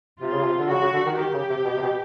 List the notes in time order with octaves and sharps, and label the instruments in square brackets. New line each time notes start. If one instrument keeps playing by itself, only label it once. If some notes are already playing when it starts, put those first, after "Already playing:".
[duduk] C3 [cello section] F4
[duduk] C#3
C3
D3
[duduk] C#3 [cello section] F#4
[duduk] C#3
D3
D#3
[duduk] D#3 [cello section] G4
[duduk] C#3
C3
B2
C3
B2